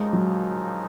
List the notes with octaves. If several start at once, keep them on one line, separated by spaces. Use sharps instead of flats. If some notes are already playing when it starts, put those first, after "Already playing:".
Already playing: D#2 C#3 F3 G#3 A#3 D#4
F#3